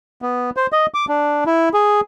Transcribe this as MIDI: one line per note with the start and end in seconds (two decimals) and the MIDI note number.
0.22 0.50 59
0.57 0.67 72
0.72 0.86 75
0.94 1.05 86
1.08 1.44 62
1.46 1.69 64
1.74 2.01 68